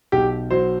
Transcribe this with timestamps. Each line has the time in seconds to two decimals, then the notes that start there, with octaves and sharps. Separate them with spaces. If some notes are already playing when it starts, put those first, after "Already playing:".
0.12 B1 G4
0.50 F#3 C5